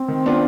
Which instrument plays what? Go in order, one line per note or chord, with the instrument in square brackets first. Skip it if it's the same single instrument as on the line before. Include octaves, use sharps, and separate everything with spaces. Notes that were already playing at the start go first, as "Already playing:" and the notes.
Already playing: [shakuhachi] C4
[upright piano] D#3
B3 D4 F4